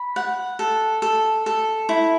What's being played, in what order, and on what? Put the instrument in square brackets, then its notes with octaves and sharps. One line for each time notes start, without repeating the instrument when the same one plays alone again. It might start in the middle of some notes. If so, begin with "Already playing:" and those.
Already playing: [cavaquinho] B5
F#5
A4
A4
A4
E4